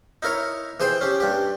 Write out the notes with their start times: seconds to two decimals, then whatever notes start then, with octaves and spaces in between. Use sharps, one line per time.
0.23 D#4 E4 A#4 C#5
0.80 E3 G#4 C5 G5
1.01 C#4 G4
1.20 G2 G4